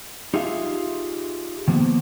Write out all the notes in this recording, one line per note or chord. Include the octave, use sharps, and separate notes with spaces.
D#4 F4 G4 G#4 E5 F5
D#3 F3 A#3 B3